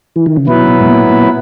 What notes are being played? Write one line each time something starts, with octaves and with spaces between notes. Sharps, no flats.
E3
D#3
C#3
B2 F#3 B3 E4 B4
B2
G#2
A#2
A#2